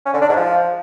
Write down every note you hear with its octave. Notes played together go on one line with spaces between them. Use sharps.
C#4
D3
D4
G#2
F3